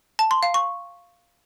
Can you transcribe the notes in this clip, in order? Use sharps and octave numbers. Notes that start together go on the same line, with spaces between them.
A5
C6
F5
C#6